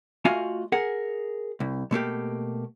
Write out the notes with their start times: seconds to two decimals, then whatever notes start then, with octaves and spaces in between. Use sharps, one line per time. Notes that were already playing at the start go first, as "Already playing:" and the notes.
0.25 A3 F4 F#4 D#5 F5 G#5
0.72 G#4 A#4 F#5
1.60 C2
1.91 B2 A3 A#3 G4